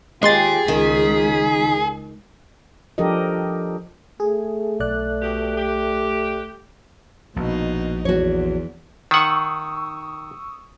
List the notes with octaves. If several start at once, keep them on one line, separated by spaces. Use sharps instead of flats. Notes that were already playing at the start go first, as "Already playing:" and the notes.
D#2 G#3 F4 G4 G#4 C6 A6
C#2 D#3 B6
F3 D4 G4 A4 A#4 D#5
A3 G#4
B1 D5 F#6
B2 G4
G4
A#1 B2 D#4
E2 F#4 C#5
D#3 F#5 C#6 D#6 E6